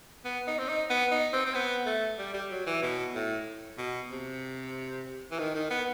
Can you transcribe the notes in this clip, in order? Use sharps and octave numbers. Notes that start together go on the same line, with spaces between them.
B3
D#4
C4
D#4
B3
D#4
C4
C4
B3
A3
G3
G3
F#3
E3
B2
A2
B2
C3
E3
D#3
D#3
B3